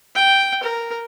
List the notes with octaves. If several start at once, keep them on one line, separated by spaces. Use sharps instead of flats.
G5
A#4